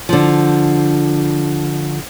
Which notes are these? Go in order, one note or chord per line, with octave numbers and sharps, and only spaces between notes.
D3 F3